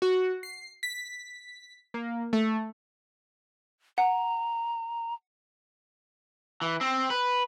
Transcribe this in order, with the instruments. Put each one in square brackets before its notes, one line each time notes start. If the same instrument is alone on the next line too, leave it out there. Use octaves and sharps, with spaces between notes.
[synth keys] F#4
C7
B6
A#3
A3
[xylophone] F#5 [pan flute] A#5
[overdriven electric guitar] E3
C4
B4